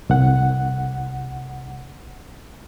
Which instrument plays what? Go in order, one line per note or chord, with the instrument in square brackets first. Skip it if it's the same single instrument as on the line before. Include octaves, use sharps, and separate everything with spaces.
[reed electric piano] C2 F#5